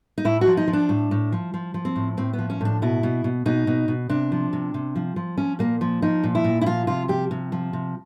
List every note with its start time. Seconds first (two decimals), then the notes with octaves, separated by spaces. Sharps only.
0.18 D#4
0.25 A2 E4
0.41 F#4
0.47 F3
0.57 D#4
0.68 F3
0.73 D4
0.89 A2
1.11 A2
1.32 F3
1.54 F3
1.74 F3
1.85 C4
1.96 A2
2.17 A2 C4
2.33 B3
2.38 F3
2.50 C#4
2.61 A2 D4
2.82 B2 E4
3.03 B2
3.24 B2
3.46 B2 D#4
3.67 B2
3.88 B2
4.09 C3 D4
4.32 F3
4.53 C3
4.74 C3
4.96 F3
5.16 F3
5.37 F3 C#4
5.59 A#2 A#3
5.81 F3
6.02 F3 D#4
6.23 A#2
6.35 E4
6.44 A#2
6.61 E4
6.66 F3 F4
6.87 C3 F4
7.08 F3 G4
7.31 C3
7.52 F3
7.73 C3